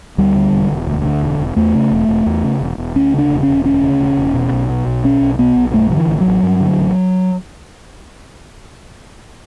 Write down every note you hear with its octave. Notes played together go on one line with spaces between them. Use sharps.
D2 G3
D3
E1
E1
D2
D3
E1
E1
E2 A3
C#3
E1
E1
E2
C#3
E1
E1
D2 C#4
C#3 D4
E1
E1 C#4
D2 C#4
C#3
E1
E1
B2
B1
B2
B1
B2 C#4
B1
B2 B3
B1
G2 A3
D3 F#3
E3
A1
F#3
A1
G2
D3
A1